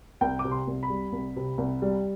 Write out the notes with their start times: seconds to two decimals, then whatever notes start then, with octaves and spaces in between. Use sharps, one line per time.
0.21 C2 G5
0.39 D6
0.44 C3
0.51 C6
0.67 C2
0.83 B5
0.90 G3
1.13 C2
1.36 C3
1.58 C2
1.82 G3